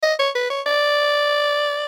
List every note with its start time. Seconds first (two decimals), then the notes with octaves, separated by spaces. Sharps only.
0.03 D#5
0.19 C#5
0.35 B4
0.50 C#5
0.66 D5